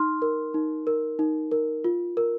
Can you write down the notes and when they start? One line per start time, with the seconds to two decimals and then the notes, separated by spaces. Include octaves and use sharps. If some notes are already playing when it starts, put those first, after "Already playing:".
Already playing: D#4 C6 F6
0.22 A#4
0.54 D#4
0.87 A#4
1.19 D#4
1.52 A#4
1.84 F4
2.17 A#4